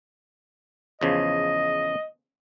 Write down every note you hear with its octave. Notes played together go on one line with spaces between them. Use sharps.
E2 C#3 F3 D#5